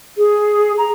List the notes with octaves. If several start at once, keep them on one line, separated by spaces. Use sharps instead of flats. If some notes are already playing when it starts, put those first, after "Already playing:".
G#4
A#5